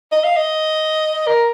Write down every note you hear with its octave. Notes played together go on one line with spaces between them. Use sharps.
D#5
F5
D#5
A#4